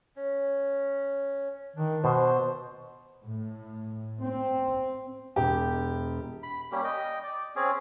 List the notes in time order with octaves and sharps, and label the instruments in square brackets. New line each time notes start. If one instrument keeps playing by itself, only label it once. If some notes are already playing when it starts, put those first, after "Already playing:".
[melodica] C#4
[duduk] D#3 [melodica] D4
[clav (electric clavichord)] B2 [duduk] C5
[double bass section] A2
C4
[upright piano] E1 [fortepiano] G4
[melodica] B5
G3 A#3 C#4 G4
D#5 G5
D5
C4 C#4 G#4